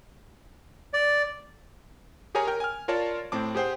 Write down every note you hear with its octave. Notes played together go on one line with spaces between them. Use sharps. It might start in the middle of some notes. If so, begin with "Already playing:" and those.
D5
G4 G#4 A#4 C#5 G#5 A#5
A#4 G5
G#5 F6
F4 A#4 C#5 D5 A5
A2 C4 A5 D6
G4 G#4 C5 F#5 G5